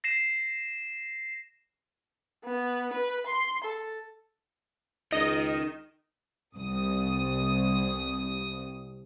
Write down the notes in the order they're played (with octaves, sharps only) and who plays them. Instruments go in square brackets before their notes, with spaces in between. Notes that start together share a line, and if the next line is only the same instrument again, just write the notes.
[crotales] A#6 C7 E7
[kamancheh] B3
B4
C6
A4
[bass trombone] C#2 [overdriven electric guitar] D#3 D#4 [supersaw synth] D#5
[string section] C2 D#6